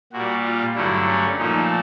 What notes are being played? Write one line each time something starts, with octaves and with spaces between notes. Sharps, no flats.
A#2 G3 F#4
F4
G2 D3 F#3 A3 E4
C#4
A#2 F3 A3 D#4